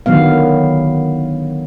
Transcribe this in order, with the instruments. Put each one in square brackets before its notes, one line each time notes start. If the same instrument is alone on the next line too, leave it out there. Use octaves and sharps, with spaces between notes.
[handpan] D3 D#3 F#3 B3 F5